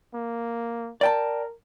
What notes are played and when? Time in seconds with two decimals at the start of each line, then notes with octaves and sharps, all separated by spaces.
0.14 A#3
1.01 A#4 D5 G5 A5